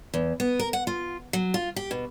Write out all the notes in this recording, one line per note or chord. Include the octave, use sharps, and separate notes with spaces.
E2
B3
A#4
F#5
F4
F#3
F4
G4
B2